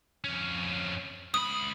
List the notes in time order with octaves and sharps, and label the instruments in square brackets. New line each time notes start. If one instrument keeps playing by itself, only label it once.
[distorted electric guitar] F2 C#4
[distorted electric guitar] C#2 B5 [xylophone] D#6